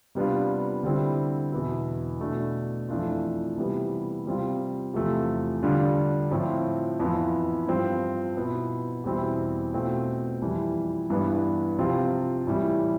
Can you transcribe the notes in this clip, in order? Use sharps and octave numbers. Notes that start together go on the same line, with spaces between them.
C3 G3 B3 D4 F4
D3 G3 C4 E4
E2 B2 B3 E4
B2 A3 D4
F2 E3 A3 D4 F4
C3 E3 G3 B3
C3 G3 C4 F4
E2 C3 F3 A3
D3 G3 D4 F4
A2 F3 C4
F2 E3 B3 F4
G2 F3 C4 F4
B2 B3 E4
E2 B2 G3 C4 E4
B2 A3 C4 F4
F2 E3 G3
G2 E3 B3 D4
C3 F3 C4 F4
A2 E3 G3